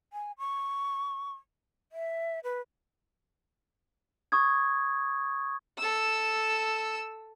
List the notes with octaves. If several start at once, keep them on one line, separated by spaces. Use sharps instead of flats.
G#5
C#6
E5
B4
C#6 D#6 G#6
A4 E6